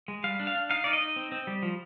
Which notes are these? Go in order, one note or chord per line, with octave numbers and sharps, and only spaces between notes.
G#3
G3 F5
D4
F5
D4
D#4 F5
D#4 D5
D#5
D#4
C4
C4
G3
F3